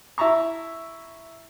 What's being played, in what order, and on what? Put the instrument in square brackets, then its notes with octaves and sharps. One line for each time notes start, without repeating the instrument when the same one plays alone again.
[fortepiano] E4 E5 A5 A#5 C#6